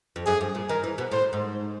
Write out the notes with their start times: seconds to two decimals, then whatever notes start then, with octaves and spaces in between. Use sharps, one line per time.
0.16 F2
0.26 F#2 G#4
0.41 G2
0.55 A#2
0.69 D#3 A#4
0.84 E3
0.98 B2
1.11 A2 C5
1.33 G#2